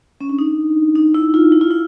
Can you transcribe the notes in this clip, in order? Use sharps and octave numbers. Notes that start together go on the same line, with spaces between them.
C#4
D4
D#4
D#4
E4
F4
E4
F4
E4